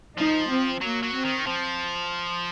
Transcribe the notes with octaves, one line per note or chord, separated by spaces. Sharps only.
F3 D#4
C4
F#3 A#3
F#3
C4
D#3
F3